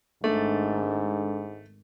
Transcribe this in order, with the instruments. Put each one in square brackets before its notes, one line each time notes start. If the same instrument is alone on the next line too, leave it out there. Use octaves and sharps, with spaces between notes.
[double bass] G#1 [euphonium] G#2 [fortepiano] A3 [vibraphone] D4 A4